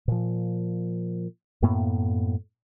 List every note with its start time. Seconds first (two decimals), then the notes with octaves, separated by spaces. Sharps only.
0.08 A#2 F3
1.62 F#2 A2 A#3 B3